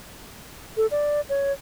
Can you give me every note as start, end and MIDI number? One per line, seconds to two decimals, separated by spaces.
0.77 0.86 69
0.91 1.21 74
1.29 1.52 73